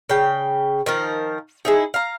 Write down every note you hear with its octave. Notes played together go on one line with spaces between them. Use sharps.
C#3 G5
D#3 F3 A#4
D#4 E4 G#4
F5 A#5